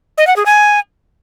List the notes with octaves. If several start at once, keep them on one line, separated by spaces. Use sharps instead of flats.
D#5
F#5
G#4
G#5